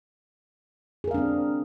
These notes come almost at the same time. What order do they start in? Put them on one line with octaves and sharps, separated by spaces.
G#4 A#4 F5 D4 C4